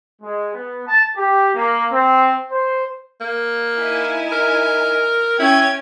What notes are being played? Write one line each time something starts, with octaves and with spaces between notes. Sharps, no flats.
G#3
B3
A5
G4
A#3
C4
C5
A#3
D#4 E4 G#5
A#4
C#4 E4 G5 G#6